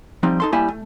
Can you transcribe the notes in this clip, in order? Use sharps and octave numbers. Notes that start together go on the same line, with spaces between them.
F3 G3 C4 D#4
D#4 A4 C6
A2 G3 A#3 E4 E5 G#5
A3